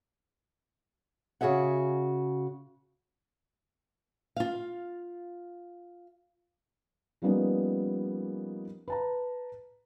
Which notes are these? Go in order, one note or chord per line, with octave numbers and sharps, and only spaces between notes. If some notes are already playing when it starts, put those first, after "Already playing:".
C#3 F#4 G#4 E5 F#5
F4 F5
F3 G3 A#3 B3 C#4 D#4
B4 A5 A#5